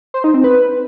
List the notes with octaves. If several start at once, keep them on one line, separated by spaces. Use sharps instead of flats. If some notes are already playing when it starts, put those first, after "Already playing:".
C5
D#4
C4
B4